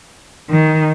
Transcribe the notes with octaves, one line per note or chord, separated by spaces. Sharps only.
D#3